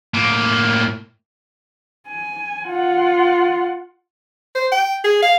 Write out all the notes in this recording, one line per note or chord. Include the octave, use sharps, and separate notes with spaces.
A2 A#3
G#5
F4 F#5
C5
G5
G#4
F5